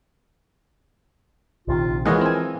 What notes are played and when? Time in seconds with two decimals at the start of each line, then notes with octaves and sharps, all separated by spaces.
1.68 A#1 C3 D#3 F4
2.06 E3 F3 G#3 A#4 C#5 D#5 F#5
2.21 C4 G#5